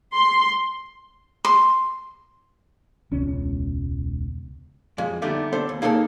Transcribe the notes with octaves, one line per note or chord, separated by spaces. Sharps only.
C6
C6
E1 C#2 C#4
F2 G#3
D3 G3 A3 B3 D4 D#4
B3 D4 A4 C5
D#2
A#3 D#4 G#4 A4 C#5 A5